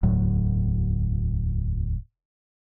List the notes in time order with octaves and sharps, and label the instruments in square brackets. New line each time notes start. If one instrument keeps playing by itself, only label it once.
[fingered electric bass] E1 D2 A2 F#3